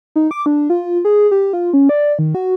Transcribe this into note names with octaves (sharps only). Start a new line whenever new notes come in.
D#4
D6
D4
F4
G#4
G4
F4
C#4
D5
D#3
F#4